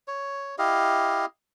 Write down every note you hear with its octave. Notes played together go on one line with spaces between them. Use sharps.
C#5
E4 G4 D#5 F5